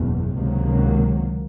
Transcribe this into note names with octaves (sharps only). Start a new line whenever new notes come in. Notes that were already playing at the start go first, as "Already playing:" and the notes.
Already playing: F#1 E2 B2
C#2 C3 D#3 F#3 A#3